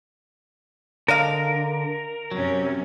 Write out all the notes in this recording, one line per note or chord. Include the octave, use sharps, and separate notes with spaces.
D3 D4 A#4 D#5 F5
F#2 C3 F#3 C#4